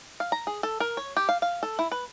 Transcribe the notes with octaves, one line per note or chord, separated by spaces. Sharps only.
F5
A#5
G#4
A4
A#4
C#5
G4
F5
F5
A4
E4
B4